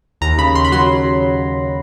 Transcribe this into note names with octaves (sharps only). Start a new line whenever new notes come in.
D#2 A#5
C#3 B5
D#2 C6
B5
F#3 C6